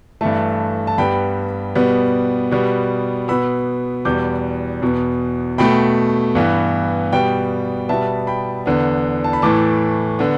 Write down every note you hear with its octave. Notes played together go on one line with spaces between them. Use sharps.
G2 E3 A3 E5 A5
A5
G2 G3 B3 G5 B5
B2 G3 B3
B2 G3 B3
B2 B3 B5 E6
E2 B2 G3 B3 D6 G6
E2 B2 B3
B2 A3 G5 B5
G2 E3 B3
B2 G3 B3 G5
B2 G3 B3 E5 A5
G5 B5
E2 D3 B3
A5
B5
A2 E3 A3 A5 D6
D3 B3